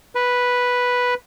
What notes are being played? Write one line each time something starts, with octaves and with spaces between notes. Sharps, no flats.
B4